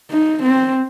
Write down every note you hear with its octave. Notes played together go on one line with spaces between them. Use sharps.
D#4
C4